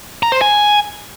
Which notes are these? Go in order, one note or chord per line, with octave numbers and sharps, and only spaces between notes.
A#5
C5
G#5